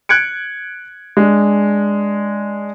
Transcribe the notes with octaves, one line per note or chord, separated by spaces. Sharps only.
F#6 G#6 C#7 D7
G#3 D4